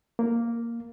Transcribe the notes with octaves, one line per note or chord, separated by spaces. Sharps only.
A#3